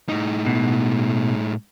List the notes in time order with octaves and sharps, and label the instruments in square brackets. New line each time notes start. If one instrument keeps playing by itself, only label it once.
[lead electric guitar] A2 D#4
[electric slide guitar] B2